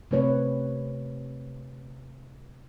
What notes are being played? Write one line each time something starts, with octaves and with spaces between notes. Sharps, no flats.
C3 A3 C4 B4 C#5